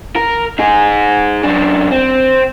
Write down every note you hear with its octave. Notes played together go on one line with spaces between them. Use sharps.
A#4
D#4 G#4
F#2 D4
C4